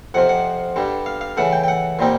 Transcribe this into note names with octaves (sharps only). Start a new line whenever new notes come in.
F2 C3 F3 F#5
F#5
G2 D3 G3
F5
F5
C#3 E3 A3 F#5
G5
G5
F#5
A#2 G3 C4 D#4